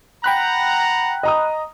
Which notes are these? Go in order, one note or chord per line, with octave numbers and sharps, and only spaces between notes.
F#5 G5 A#5 B5 F#6
D#5 A#5 D#6